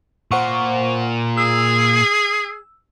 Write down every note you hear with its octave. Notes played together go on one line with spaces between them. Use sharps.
A#2 F4 C5 F#5 C#6
G#4 E6